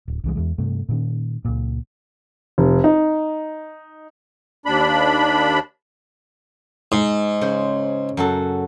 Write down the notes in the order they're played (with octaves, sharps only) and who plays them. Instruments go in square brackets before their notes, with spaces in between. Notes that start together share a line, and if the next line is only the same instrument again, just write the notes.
[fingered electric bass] D1
C2 E3 G#3
E2 E3 G#3
G2 C3 A3
A#2 D#3 C#4
C#2 A#2
[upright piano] F1
D#4
[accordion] D#2 D4 B5
[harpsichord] G#2
[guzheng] C#3 C5
F#2 F#4 A4